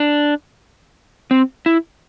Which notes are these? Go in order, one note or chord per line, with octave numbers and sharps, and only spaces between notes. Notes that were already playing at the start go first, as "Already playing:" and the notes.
Already playing: D4
C4
E4